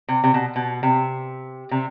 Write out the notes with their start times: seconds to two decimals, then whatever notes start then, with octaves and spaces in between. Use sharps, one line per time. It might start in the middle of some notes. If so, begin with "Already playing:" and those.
0.08 C3
0.24 C3
0.34 B2
0.56 B2
0.83 C3
1.71 C3